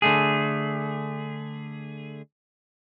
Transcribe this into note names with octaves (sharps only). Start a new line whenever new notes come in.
D3 A3 G#4